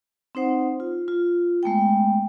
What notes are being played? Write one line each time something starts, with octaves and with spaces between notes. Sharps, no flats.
C4 D#4 C5 F#5
F4
F4
G#3 A3 B3 G5